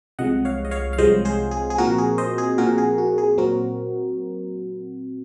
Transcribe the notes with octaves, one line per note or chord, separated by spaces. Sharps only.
C2 C3 F3 G#3 D#5 F#5
C#5 F5
D#5
C#5 F5
F5
C2 C3 F3 G#3 C5 D#5
G#4 C5
G#4
G#4
A#2 F3 C4 F#4 A#4
G#4
C5 D#5
G#4
A#2 F3 C4 F#4 A#4
G#4
F#4
G#4
A#2 F#3 C4 F#4 A#4